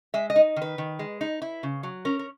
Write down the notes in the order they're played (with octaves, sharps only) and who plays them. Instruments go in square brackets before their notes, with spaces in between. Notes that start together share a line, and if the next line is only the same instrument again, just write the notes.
[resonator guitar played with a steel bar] G#3 E5
D#5
D#4
D#3
B4
D#3
G#3
D#4
E4
C#3
F#3
C#4 A#4
A#4